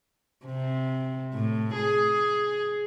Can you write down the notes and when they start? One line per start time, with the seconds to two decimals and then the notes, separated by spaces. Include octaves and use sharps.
0.46 C3
1.33 A2
1.75 G#4